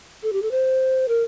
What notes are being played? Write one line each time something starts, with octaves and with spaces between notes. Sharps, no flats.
A4
G4
A4
C5
A#4